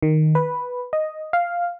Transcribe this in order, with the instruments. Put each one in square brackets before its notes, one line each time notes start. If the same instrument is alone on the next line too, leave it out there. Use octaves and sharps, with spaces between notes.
[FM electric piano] D#3
B4
D#5
F5